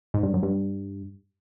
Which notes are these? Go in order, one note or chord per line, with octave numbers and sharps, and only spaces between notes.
G#2
G2
F#2
G2